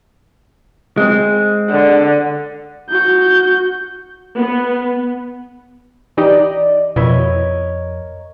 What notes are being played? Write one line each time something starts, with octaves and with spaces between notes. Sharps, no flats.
G#3 C4
D3
F#4 G6
B3
E3 D#4 G4 D5 D#5
F2 B2 E4 A#4 C#5 D#5